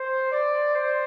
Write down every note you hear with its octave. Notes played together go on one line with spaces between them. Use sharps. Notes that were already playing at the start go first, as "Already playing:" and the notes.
Already playing: C5
D5
C5